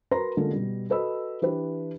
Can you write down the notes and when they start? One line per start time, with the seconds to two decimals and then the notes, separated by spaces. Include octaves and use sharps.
0.11 F#4 A#4 B4 A#5 C6 A#6
0.37 D3 G#3 A#3 C#4 F4 A4
0.51 B2 G3
0.90 F#4 A4 B4 D#5 B5 E6
1.42 E3 D4 G4 B4